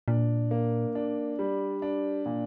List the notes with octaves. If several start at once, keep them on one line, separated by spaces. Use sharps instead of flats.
A#2 D4
A#3
D4
G3
D4
A#2